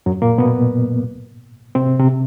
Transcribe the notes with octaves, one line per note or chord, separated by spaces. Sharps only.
F#2 F#3
A#2 A#3
B2 B3
C3 C4
C3 C4